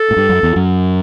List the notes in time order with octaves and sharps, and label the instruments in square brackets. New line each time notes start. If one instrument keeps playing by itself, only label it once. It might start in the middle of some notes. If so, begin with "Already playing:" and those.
Already playing: [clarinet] A4
[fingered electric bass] A2
G2
F#2
E2
F#2